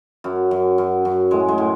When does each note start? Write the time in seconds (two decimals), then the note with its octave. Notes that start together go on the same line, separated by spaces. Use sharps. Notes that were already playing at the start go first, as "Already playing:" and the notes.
0.24 F#2
0.51 F#2
0.78 F#2
1.05 F#2
1.31 A2 G#3
1.48 G#3
1.58 A2